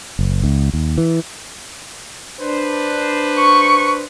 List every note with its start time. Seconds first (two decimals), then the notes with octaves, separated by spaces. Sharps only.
0.19 F#1
0.43 C#2
0.74 D#2
0.98 E3
2.40 D4 B4 C5
3.39 C#6